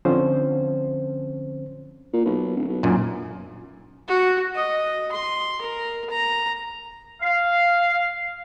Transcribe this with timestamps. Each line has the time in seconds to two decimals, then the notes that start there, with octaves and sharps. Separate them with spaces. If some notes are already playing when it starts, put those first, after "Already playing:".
0.05 D3 F3 C4 C#4 C5
2.13 A#2
2.25 B1
2.56 D1
2.68 B1
2.83 A#1 F#2 A#2
4.08 F#4
4.55 D#5
5.12 C6
5.61 A#4
6.10 A#5
7.21 F5